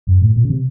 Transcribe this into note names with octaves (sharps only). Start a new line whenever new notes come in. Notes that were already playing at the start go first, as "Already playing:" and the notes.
F#2
A2
A#2
C#3
C3